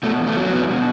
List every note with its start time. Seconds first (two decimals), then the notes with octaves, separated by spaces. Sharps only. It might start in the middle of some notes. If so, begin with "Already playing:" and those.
0.03 B2 A3
0.19 E2
0.27 A3
0.37 F#3
0.52 E2 B3
0.69 B2